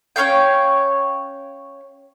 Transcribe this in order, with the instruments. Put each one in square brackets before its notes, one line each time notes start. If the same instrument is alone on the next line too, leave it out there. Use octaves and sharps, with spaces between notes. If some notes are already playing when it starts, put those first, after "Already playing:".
[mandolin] C#4 C#5 F5 G5